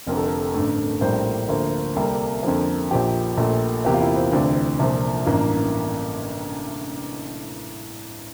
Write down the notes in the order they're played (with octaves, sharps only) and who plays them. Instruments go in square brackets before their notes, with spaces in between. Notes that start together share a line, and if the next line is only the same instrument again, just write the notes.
[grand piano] F1 F2 D3 A#4
A4
A#4
A1 G2 D3 A3
A#1 A2 G3 A#3 C5
D2 D3 F3 A#3
C2 C3 G3 A#3 A4
F2 D3 F3 A#3
A#1 A#2 F3 G4
A#1 A#2 A3
E2 C3 E3 A#3 G4
F4
E4
C4
D2 C3 E3 D4
C2 A#2 F3
A1 G2 E3 A#3